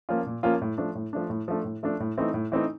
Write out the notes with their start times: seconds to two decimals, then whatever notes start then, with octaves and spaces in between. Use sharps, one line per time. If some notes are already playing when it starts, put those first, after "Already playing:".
0.09 F3 A#3 C#4 F4
0.26 A#2
0.43 F3 A#3 C#4 F4
0.61 A2
0.78 F3 A3 D4
0.95 A2
1.13 F3 A3 D4
1.30 A2
1.48 F3 A3 D4
1.65 A2
1.83 F3 A3 D4
2.00 A2
2.18 E3 A3 C4 D#4
2.34 A2
2.52 E3 A3 C4 D#4